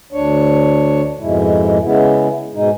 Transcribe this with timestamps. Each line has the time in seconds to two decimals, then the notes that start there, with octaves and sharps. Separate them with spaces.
0.13 D2 D4 C#5
1.20 F2 G#2 B2 G#3 E4
1.83 C#3 G#3 B3 E4
2.55 G#2 B2 G#3 D#4